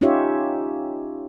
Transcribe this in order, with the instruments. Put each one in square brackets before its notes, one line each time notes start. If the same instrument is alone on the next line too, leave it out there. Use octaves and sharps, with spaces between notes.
[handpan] C#4 D#4 F4 G4 C#5 E5